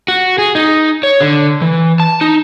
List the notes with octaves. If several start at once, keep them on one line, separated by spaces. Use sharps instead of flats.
F#4
G#4
D#4
C#5
D3
E3
A5
D#4